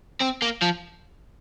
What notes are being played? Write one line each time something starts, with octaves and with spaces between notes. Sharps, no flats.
C4
A#3
F3